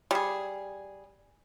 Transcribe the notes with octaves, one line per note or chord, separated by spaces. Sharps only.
G3 G#4